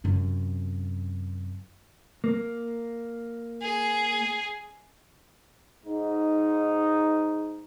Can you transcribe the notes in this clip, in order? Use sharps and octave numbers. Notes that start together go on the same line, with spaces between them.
F#2 C3
A#3
G#4
G#2 D#4